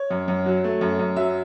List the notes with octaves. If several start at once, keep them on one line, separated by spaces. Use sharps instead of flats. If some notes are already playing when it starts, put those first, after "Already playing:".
Already playing: C#5
F#2
F#2
F#3
A3
F#2
F#2
F#3 E5